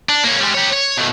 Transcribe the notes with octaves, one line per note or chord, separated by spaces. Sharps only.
D4
A#3 C#4
G3 G#3
G4 C#5
C#5
B2 A3